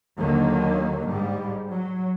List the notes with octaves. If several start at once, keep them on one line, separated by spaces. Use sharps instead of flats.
D#2 D3 D#3 F#3 A#3
G#2 G3
F#3